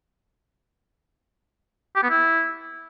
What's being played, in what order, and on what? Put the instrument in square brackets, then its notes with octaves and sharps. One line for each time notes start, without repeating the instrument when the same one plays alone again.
[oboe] G4
B3
E4